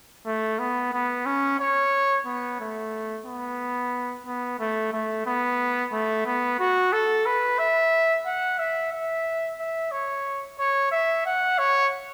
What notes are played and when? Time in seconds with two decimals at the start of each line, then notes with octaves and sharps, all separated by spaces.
0.26 A3
0.59 B3
0.93 B3
1.26 C#4
1.60 C#5
2.26 B3
2.60 A3
3.26 B3
4.26 B3
4.60 A3
4.93 A3
5.27 B3
5.92 A3
6.26 B3
6.59 F#4
6.93 A4
7.26 B4
7.59 E5
8.26 F#5
8.59 E5
8.92 E5
9.59 E5
9.92 C#5
10.59 C#5
10.92 E5
11.26 F#5
11.59 C#5